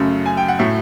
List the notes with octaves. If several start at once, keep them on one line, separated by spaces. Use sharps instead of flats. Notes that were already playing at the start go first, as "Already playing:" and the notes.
Already playing: F#2 C#3 F#3 A3
G#5
G5
F#5
A2 F#3 A3 E5